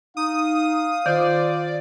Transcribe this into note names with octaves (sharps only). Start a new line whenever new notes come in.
D#4 F5 D#6
D#3 F4 C5 D5